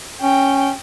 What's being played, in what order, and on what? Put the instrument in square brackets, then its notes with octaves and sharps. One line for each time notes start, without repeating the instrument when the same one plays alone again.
[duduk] C#4 [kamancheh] G5